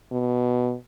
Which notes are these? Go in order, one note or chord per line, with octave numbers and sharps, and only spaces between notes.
B2